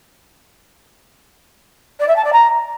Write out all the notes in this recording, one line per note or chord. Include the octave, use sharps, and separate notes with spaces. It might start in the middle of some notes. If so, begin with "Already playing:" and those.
D5
E5
A5
D5
A#5